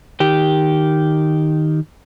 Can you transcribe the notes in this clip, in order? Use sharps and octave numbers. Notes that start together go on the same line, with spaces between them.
D#3 G4